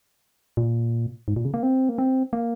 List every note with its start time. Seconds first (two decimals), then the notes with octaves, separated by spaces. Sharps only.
0.57 A#2
1.28 G#2
1.36 A#2
1.45 C#3
1.54 A#3
1.63 C4
1.89 A#3
1.98 C4
2.33 A#3